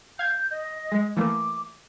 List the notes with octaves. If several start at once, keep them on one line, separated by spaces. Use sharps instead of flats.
F5 G6 G#6
D#5
G#3
E3 A3 A#3 D6